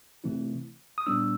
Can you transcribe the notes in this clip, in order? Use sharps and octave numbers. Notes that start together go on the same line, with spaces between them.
C3 E3 A3 C4 E4
D#6
A#2 G3 B3 D4 E6